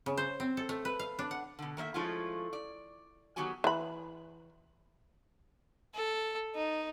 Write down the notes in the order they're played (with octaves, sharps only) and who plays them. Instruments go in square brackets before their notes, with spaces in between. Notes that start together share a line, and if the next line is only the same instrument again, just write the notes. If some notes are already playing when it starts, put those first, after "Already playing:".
[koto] C#3
C5
C4
A4
A3
B4
F5
D4
F#5
[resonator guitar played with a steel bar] B2 D3
D#3 A#3 D#5 E5
F3 G#3 A3 C#4 E4 F4
D5
D#3 F#3 B3 F#4 G4 G#5
[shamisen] E3 B5
[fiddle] A4
D#4